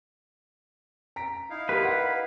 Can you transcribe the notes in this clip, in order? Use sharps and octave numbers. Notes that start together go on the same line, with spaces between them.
A#5 B6 D7
D#4 E4 F5
G4 A#4 B4 C6
F#5